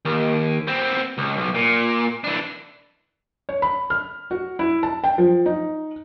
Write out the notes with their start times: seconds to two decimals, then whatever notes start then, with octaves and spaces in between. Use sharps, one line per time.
0.05 D#2
0.67 B3 C4
1.18 C#2
1.37 B1
1.54 A#2
2.24 E3 D4
3.49 C#5
3.62 B5
3.90 F6
4.31 F#4
4.59 E4
4.83 A5
5.04 G5
5.18 F3
5.46 D#4